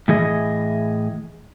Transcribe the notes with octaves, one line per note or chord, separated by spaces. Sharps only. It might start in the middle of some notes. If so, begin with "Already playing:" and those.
A2 E3 G#4 D#5